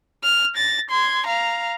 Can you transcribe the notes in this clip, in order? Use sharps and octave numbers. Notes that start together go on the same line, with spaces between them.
F6
A6 A#6
C6 G#6
F5 A#5